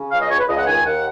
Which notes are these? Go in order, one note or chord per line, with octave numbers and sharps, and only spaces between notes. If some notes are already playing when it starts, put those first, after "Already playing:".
Already playing: C#3
C#2 F5
D#5
C#2 C#5
B4
C#2 D#5
F#5
D#3 G#5
D#2 F#5